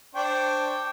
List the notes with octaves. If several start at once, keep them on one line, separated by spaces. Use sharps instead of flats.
D4 C5 G5 C#6